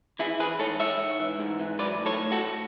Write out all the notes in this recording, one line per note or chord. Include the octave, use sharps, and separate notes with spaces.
E3 E4 G#4
E3 G#4 B4
G#2 A4 C#5
G#2 C#5 E5
G#2
E3
G#2
E3
F#3 B4 D5
A2
A4 C#5
A2
F#4 A4
A2